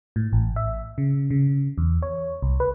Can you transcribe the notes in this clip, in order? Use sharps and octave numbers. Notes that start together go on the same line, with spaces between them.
A2
A1
E5
C#3
C#3
E2
C#5
C2
B4